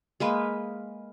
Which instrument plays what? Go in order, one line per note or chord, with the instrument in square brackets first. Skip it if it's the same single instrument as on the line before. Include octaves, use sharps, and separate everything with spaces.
[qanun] G#3 A#3 B4